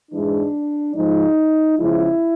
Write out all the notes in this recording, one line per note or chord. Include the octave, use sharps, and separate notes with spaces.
G#2 E3 G#3 D4
G#2 F3 G#3 D#4
E2 C#3 F3 G#3 E4